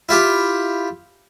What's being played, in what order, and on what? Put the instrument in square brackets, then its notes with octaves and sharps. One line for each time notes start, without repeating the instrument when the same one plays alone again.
[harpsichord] E4 F4 G4